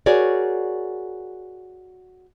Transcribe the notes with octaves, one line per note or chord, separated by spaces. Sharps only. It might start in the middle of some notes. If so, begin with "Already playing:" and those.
F#4 G#4 A#4 C#5 D5